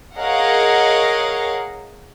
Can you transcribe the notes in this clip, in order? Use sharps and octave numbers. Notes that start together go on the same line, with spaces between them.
G#4 A#4 C#5 D#5 F5 F#5